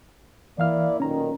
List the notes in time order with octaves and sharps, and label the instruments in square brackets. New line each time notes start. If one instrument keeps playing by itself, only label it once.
[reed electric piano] E3 F5 F6 [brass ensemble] A#3 E4 D5
[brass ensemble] B1 A#2 D#3 [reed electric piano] C#4 A#5